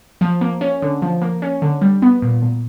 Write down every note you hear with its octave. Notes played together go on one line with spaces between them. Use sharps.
F3
A#3
C#4
D3
F3
A#3
C#4
D3
G3
B3
A#2
A#2